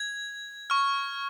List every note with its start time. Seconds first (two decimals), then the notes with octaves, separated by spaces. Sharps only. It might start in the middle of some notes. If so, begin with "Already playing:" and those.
Already playing: G#6
0.70 C#6 F6